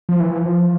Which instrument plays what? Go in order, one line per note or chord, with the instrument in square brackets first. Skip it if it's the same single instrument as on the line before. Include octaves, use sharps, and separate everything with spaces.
[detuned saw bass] F3
E3
F3